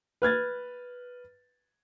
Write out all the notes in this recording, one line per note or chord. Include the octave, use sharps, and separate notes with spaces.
B4 F6 G#6 A6